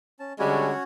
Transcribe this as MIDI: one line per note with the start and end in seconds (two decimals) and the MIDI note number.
0.20 0.33 61
0.20 0.33 81
0.39 0.71 50
0.39 0.71 55
0.39 0.71 56
0.39 0.83 61
0.39 0.83 66
0.39 0.83 73